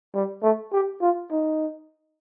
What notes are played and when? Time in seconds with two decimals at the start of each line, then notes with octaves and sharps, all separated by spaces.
0.15 G3
0.43 A3
0.72 G4
1.02 F4
1.31 D#4